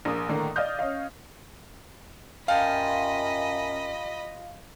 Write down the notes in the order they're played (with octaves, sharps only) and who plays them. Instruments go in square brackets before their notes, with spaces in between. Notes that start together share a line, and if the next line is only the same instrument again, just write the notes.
[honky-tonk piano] A#1 A#3 D#6
A2 D3 D#3 A#3
D5 D#5 F5 D#6 F6 G6
C#4 C#5 D#5 F5
[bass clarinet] F#2 [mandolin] F4 G4 A5 [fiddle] D#5 B5 [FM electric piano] F5